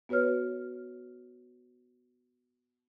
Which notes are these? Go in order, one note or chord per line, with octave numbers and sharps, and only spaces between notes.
B3 F#4 B4 C#5 F6